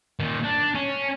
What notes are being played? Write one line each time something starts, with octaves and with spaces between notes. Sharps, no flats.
A#2 D#3
D4
C#4